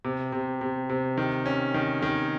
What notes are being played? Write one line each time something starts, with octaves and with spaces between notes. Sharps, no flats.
C3
C3
C3
C3
D#3
C#4
D#3
D#3